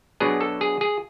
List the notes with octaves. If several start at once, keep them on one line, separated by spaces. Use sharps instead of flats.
B2 F#3 B3 D4 G#4
A4
G#4
G#4